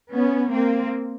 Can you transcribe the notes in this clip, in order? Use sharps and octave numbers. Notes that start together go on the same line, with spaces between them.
B3 C#4
A#3 C4